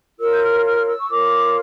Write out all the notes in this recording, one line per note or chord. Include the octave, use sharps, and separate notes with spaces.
F4 A#4 C#5 E6
G6
F6
F6
E6
C#6
F4 A#4 C#5 D6